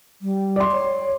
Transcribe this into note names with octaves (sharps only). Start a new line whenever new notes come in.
G3
D5 C6
C#5